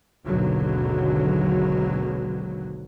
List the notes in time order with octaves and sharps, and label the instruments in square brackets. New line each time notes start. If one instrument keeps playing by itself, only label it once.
[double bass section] G#1 D#2 B2 D3 F#3